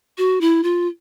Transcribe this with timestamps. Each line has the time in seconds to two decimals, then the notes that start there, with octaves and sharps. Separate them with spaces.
0.18 F#4
0.41 E4
0.63 F4